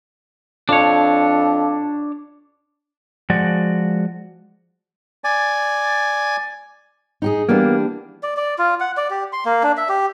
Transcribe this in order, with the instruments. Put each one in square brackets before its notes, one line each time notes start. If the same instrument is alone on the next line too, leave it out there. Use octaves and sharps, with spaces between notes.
[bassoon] F2 [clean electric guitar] D4 C#5
[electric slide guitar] F3 G#3 F#4 D5
[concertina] D5 G#5
[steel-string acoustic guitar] D#4 G4 G#4
[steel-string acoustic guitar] E3 G3 D4 [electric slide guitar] A#3 B3
[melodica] D5
D5
F4
F#5
D5
G4
C6
A#3
D4
E5
G4